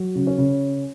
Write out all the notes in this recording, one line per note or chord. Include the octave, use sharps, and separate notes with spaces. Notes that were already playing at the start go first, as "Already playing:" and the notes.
Already playing: F#3
C#3
C#4
C#3